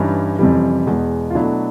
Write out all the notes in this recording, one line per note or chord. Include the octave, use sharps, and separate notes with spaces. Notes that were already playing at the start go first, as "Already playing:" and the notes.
Already playing: G2 E3 G3 C#4 D#4
F2 C3 E3 G3
E2 B2 G#3
F4
B2 F#3 A3 D4 E4